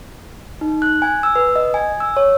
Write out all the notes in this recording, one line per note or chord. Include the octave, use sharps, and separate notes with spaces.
D#4
F#6
G#5
E6
B4
D#5
G#5
E6
C#5